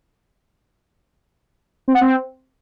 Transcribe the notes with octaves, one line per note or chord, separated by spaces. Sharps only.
C4
F#5
C4